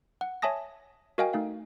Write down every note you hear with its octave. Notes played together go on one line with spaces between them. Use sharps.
F#5
C#5 E5 G#5 A5 D#6 A#6
F#4 A#4 D#5 F5 G5 G#5
A3 D#4 F5